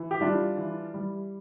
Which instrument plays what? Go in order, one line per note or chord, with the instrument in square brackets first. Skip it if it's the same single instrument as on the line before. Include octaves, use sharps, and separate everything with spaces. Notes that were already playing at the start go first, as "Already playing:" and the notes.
Already playing: [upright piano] E3
G4
G3 D4 F4
E3
G3